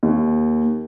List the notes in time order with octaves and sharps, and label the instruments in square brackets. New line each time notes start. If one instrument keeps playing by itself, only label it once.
[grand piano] D#2